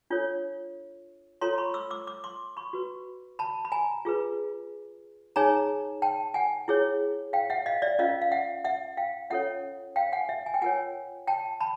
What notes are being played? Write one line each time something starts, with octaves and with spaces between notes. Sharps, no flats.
D4 F4 A4 C#5
F4 A4 C#5 A#5 C6
B5 C#6
D6 E6
D6 E6
D6 E6
C6 D6
B5 C#6
F#4 B4
A5 B5
B5
G#5 A#5
F4 G#4 B4
D#4 G#4 C#5 G#5 A#5
G5 A5
F#5 G#5
E4 G#4 C#5
F5 G5
E5 F#5
D#5 F5
D5 E5
C#4 F4 A#4 D#5 F5
F5
E5 F#5
E5 F#5
F5 G5
C#4 F4 A4 C#5 E5 F#5
F5 G5
F#5 G#5
E5 F#5
G#5
G5
F4 A#4 C#5 F#5 G#5
G5 A5
A5 B5